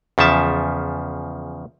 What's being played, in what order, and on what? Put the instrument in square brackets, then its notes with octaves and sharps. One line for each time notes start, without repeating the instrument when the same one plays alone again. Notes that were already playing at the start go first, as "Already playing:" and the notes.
[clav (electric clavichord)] E2 C#3 F3 E5 A5